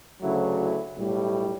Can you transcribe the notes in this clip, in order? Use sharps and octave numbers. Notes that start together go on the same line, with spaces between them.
D2 C#3 F#3 A3 E4
E4
B1 A2 G3